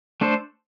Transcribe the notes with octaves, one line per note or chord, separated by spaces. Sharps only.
A3 D4 A4 C5